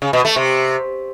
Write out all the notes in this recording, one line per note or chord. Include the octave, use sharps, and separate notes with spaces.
C#3
B2
A3
C3